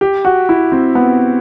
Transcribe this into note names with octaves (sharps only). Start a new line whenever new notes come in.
G4
F#4
E4
C4
B3